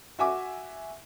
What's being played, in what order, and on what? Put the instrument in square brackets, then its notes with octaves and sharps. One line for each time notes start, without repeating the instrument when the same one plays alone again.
[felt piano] F#4 E5 G#5 D6